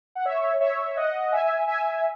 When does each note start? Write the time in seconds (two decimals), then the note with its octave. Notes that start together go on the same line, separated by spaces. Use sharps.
0.15 F#5
0.25 C#5 E5
0.60 C#5 E5
0.96 D#5 F#5
1.32 E5 G#5
1.67 E5 G#5